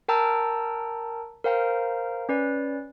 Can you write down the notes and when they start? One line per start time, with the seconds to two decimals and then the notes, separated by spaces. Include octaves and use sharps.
0.08 A#4 G5 A5 A#5 E6
1.44 A#4 C5 F5 G5 A#5
2.29 C#4 B4 D5